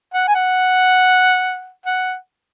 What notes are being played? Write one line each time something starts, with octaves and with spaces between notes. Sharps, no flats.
F#5
G#5
F#5
F#5